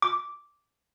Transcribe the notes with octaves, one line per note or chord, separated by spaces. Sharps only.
D6